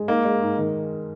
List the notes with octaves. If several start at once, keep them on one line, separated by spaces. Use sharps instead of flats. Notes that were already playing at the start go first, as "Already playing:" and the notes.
Already playing: G#3
A#3 D#4
G#3
G#2
D#3